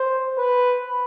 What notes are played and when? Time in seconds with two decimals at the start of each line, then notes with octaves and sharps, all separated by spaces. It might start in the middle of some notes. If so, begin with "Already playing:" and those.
Already playing: C5
0.38 B4